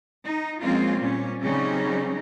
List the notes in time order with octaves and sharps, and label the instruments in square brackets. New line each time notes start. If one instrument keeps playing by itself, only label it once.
[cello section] D#4
F3 G#3 A#3 C4 C#4 F4
A#2 G3 C#4
C#3 F#3 G3 C4 C#4 D#4